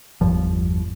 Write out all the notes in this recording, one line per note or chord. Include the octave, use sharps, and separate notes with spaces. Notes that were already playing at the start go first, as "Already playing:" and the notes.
G1 E2 G2 F3